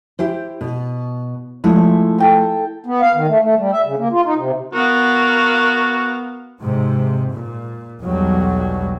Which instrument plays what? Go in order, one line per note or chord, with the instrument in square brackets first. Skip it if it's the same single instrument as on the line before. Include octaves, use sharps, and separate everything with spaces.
[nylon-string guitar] E4 G4 C5
B2
[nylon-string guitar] F3 G#3 A3 [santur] E4
[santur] A4 G5 A#5
[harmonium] B3
F5
D#3
A3
A3
G3
E5
C#3
A#3
F4
D#4
C3
[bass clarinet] B3 [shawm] F#4 [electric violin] A#4 F5
[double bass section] G#2 C3
A#2
B1 E2 F#3 G3